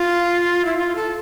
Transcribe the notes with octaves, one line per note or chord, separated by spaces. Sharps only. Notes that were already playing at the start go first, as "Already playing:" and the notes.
Already playing: F4
E4
F4
A4